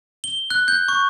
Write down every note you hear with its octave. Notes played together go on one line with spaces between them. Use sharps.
G7
F#6
G6
C#6